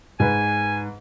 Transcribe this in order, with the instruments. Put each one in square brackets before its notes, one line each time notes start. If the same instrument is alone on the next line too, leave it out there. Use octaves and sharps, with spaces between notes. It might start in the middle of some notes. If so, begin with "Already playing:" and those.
[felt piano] G#2 B4 [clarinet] G#5